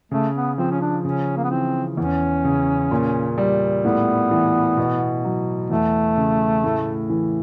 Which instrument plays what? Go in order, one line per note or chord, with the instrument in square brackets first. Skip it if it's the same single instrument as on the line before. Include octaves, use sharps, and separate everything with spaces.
[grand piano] C#3 [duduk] A3
[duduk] B3
[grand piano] F3 [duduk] C4
[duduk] C#4
D4
[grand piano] C#3 [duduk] C#4
[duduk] A#3
B3
[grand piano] E3 [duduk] C4
[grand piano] E2 [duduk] C#4
[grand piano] C#3
A#2
G3
[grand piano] A2 [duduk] B3
[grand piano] E3
B2
F#3
[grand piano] E2 [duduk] A3
[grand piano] C#3
A2
E3